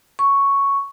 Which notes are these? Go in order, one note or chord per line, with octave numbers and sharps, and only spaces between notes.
C#6